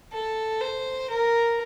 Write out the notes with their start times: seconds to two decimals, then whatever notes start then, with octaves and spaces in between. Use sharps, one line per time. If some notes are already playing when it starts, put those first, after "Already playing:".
0.12 A4
0.61 C5
1.10 A#4